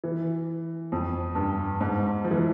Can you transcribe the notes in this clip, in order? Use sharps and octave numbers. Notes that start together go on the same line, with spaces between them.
E3
F2
G2
G#2
F3
E3
F3